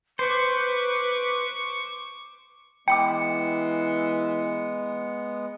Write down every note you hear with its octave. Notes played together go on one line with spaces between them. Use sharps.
B4 C5 C#6 D6
E3 G#3 B3 G5 B5 D6 C#7